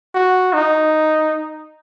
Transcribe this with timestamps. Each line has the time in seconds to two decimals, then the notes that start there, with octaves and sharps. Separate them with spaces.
0.15 F#4
0.53 D#4